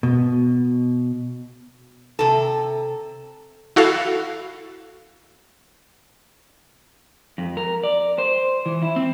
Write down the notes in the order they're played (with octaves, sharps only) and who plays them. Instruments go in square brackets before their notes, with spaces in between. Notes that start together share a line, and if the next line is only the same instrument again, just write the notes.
[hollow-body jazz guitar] B2
[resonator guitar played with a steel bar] C3 A4
[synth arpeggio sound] E4 F#4 A4 F5
[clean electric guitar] F2
A#4
D5
C5
E3
E4
C4